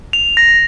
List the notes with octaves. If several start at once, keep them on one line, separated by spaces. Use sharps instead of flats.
F7
A#6